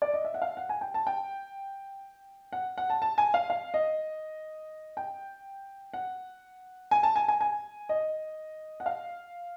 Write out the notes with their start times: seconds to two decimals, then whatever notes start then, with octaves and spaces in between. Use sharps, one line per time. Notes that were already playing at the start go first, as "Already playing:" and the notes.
0.02 D5
0.14 D#5
0.24 E5
0.34 F#5
0.42 F5
0.57 F#5
0.69 G#5
0.81 G5
0.94 A5
1.07 G5
2.53 F#5
2.78 F#5
2.90 A5
3.02 A5
3.18 G#5
3.34 F5
3.50 F5
3.74 D#5
4.97 G5
5.94 F#5
6.91 G#5
7.03 A5
7.16 G#5
7.28 G#5
7.41 G#5
7.89 D#5
8.80 F#5
8.86 F5